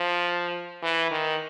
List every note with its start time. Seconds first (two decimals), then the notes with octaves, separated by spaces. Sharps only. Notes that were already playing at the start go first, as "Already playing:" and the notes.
Already playing: F3
0.83 E3
1.11 D#3